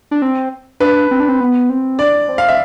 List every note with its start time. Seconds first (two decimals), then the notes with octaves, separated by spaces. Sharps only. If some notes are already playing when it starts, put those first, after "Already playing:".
0.11 D4
0.22 C4
0.80 D4 B4
1.11 C4
1.20 D4
1.29 C4
1.41 B3
1.70 C4
1.99 D4 D5
2.29 C4
2.38 F5
2.49 E5